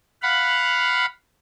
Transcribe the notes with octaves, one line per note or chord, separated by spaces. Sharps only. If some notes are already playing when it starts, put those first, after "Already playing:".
F5 F#5 B5